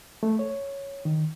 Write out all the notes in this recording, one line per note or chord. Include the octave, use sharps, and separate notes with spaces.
A3
C#5
D#3